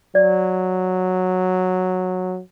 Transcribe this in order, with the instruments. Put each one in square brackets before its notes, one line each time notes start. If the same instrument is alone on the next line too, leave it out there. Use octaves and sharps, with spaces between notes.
[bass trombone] F#3 [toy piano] D5